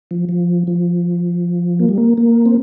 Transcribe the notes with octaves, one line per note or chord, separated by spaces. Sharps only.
F3
F3
F3
A#3
G3
A#3
A#3
C4